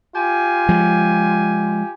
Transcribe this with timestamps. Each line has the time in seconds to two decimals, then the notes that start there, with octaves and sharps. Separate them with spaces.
0.16 F4 G4 G#5
0.69 F3 G#3